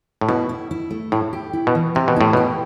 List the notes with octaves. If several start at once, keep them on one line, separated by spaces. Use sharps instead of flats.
A2
B2 E4
E4
E4
A3
A2 E4
G4
E4
B2
E3
C3 G4
B2
A2 E4
B2 G4